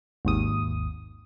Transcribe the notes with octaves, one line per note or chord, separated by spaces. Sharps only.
G#1 D#2 D#6